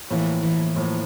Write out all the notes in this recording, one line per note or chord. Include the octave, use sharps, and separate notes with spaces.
A2 E3 F3 A#3
E3
A2 F3 A#3